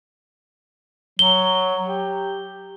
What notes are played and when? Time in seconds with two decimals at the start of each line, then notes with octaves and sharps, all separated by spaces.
1.19 F#3 G7
1.86 G4